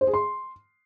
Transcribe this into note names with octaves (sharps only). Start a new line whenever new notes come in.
C5
G#4
C6